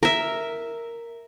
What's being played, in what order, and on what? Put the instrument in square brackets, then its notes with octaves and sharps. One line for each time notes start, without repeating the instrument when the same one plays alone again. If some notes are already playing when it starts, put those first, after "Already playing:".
[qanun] A#4 E5